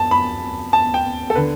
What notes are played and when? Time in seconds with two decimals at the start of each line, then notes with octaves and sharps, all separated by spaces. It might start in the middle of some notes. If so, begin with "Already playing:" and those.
Already playing: F#2 A5
0.11 B5
0.73 A5
0.94 G5
1.30 A4
1.35 D3 B4